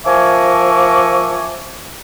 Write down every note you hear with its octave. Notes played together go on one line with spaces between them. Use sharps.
F3 A#4 E5 G#5 C#6 D6